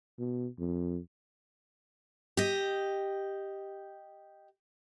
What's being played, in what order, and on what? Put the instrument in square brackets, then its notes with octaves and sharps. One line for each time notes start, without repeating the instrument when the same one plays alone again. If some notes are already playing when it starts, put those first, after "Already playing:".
[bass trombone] B2
F2
[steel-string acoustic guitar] G4 D#5